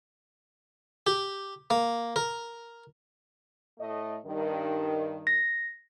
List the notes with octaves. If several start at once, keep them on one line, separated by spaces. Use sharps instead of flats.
G4
A#3
A#4
A2 A3 D#5
G2 D#3
A#6